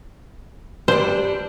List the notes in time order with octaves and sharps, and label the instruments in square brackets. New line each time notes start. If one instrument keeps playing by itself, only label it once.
[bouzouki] G3 D4 [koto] C5